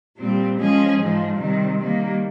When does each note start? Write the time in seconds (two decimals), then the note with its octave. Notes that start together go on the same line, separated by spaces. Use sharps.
0.17 A#2 G3 C4
0.56 F3 G#3 C#4 G#4
0.97 G#2 F3 G#3
1.37 C3 D#3 G3
1.77 D#3 G3 A#3